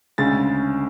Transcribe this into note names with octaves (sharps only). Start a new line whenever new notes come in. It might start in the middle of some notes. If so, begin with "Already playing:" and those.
D2 C#3 G#3 A6